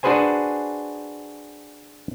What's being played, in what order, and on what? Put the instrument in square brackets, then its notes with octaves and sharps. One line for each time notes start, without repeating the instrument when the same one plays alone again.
[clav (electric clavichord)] D4 F#4 G#4 B4 C5 G#5